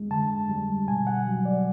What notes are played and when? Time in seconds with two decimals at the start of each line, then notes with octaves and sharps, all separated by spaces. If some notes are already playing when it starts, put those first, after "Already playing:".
Already playing: G#3
0.11 D3 A5
0.50 G3
0.88 B2 G#5
1.07 F#5
1.26 F#3
1.45 D5